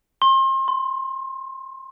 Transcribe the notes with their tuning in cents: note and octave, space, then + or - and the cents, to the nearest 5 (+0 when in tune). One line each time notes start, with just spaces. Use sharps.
C6 +35
C6 -25